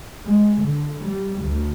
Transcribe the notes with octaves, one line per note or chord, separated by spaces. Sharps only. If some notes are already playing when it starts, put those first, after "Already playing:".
G#3
D3
G3
D2